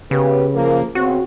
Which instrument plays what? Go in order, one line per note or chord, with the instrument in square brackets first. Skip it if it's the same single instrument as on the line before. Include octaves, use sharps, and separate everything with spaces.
[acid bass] C#3 [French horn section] B3 G4 B4
[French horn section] F3 A#3
[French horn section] C#3 B3 C4 [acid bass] F#4